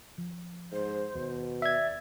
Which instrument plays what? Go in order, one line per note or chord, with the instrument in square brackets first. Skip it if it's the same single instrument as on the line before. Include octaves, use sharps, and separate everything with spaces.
[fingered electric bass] F3
[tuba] G#2 [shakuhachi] C5
[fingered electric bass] D#2 [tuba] B2
[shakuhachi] D5 [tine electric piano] E5 G#6